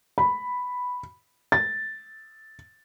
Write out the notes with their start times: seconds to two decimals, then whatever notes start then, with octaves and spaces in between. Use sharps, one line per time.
0.18 B5
1.52 A6